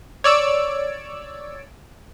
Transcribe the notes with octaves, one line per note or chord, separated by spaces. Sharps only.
C#5 D5 E6 D7